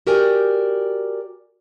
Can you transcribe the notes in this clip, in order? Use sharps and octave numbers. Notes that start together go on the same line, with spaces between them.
F#4 G4 A#4 D5 G5 G#5